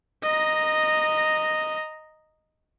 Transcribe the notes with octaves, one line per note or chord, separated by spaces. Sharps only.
D#5 A#5